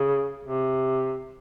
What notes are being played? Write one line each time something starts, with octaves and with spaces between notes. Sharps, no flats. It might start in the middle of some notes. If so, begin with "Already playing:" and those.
Already playing: C#3
C3